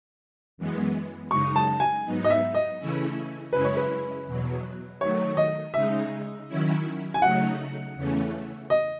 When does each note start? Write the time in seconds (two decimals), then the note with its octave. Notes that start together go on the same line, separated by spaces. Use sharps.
0.58 F#2 E3 G#3 B3
1.31 F#2 C#3 G#3 D#4 C#6
1.56 A5
1.80 G#5
2.05 G#2 F#3 B3 D#4
2.24 D#5
2.30 E5
2.54 D#5
2.79 C#3 E3 A3 C#4 E4
3.53 F#2 C#3 G#3 C#4 E4 B4
3.65 C#5
3.77 B4
4.26 E2 B2 F#3
5.00 D#3 F#3 A3 C#5
5.37 D#5
5.74 C#3 G#3 D#4 E5
6.48 D#3 F#3 C#4 E4
7.14 G#5
7.22 C#3 F#3 A3 D#4 F#5
7.95 E2 C#3 E3 A3 C#4
8.70 D#5